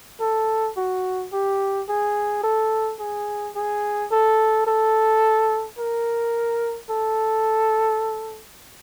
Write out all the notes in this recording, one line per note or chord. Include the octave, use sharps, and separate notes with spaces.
A4
F#4
G4
G#4
A4
G#4
G#4
A4
A4
A#4
A4